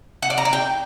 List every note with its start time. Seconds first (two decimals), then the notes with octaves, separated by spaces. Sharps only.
0.22 F#5
0.30 D5
0.38 A#5
0.45 D5
0.53 G5